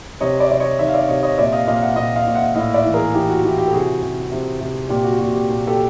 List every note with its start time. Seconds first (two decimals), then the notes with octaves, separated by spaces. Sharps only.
0.20 C3 C#5 D#5
0.40 D5 E5
0.51 C3 D5
0.60 C#5 D#5
0.79 D#3 D5 E5
0.88 F5
0.94 D5 E5
1.08 C3 C#5 D#5
1.23 C#5 D#5
1.38 A#2 D5 E5
1.52 D#5 F5
1.67 A#2 D#5 F5
1.82 E5 F#5
1.96 A#2 D#5 F5
2.16 D#5 F5
2.27 A#2
2.35 E5 F#5
2.55 A2 D#5 F5
2.74 D5 E5
2.85 E3
2.94 G#4 A#4
3.14 E3 G4
3.29 F#4
3.44 E3 G4
3.58 G4
3.67 A4
3.73 C3 F#4 G#4
4.02 C3
4.32 C3
4.61 C3
4.89 A#2 G4
5.04 F#4
5.19 A#2 F#4
5.33 G4
5.49 A#2
5.67 G4 A4